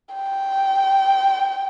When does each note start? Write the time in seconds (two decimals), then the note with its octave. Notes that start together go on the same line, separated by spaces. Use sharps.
0.15 G5